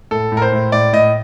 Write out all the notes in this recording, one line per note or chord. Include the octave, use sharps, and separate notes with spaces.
A2 A4
A2
A#4
C5
A2
A2 D5
A2 D#5